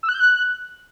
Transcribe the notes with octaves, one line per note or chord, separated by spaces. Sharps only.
E6
F#6
G6
F#6